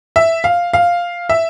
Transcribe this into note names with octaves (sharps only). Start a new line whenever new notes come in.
E5
F5
F5
E5